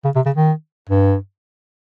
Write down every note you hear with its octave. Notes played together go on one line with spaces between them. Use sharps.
C#3
C3
C#3
D#3
G2